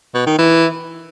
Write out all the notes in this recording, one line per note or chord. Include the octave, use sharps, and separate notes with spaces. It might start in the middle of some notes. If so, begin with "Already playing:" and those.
B2
D#3
E3